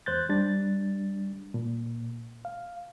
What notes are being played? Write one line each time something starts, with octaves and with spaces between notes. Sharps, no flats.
E2 C5 F#6 G6 A6
G3 D4 A6
A#2
F5